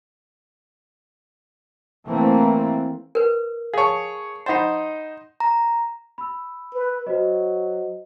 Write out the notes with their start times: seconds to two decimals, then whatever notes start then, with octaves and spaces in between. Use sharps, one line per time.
2.07 E3 A3 A#3 C4
3.15 A#4 B4
3.74 G#4 C#5 F5 A5
4.46 D#4 C5 D#5 F#5 B5
5.40 A#5
6.18 B5 E6
6.73 B4
7.07 F#3 F#4 C5 D#5